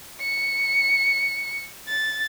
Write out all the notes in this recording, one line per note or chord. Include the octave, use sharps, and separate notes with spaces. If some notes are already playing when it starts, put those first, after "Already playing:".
C#7
A6